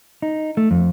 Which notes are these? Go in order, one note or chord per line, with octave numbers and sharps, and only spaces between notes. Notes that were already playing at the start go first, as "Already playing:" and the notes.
D#4
A3
F2